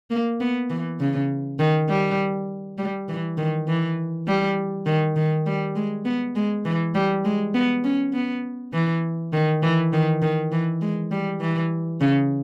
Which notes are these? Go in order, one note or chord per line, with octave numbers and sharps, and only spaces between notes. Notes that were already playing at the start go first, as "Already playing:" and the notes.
A#3
B3
E3
C#3
D#3
G3
G3
E3
D#3
E3
G3
D#3
D#3
G3
G#3
B3
G#3
E3
G3
G#3
B3
C#4
B3
E3
D#3
E3
D#3
D#3
E3
G#3
G3
E3
C#3